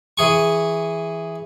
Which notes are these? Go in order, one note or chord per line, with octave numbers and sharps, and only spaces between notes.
E3 G#4 C#6